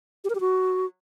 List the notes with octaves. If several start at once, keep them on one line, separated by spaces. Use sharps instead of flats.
G4
A#4
G4
F#4